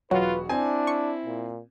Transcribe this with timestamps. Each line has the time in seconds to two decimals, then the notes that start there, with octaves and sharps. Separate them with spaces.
0.11 E1 F#3 F4 F#4 B4 F#5
0.49 C4 D4 E4 G#5
0.87 C#6
1.26 A#2